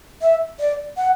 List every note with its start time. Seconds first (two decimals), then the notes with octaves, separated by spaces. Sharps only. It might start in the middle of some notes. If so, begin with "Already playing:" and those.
0.22 E5
0.59 D5
0.97 F#5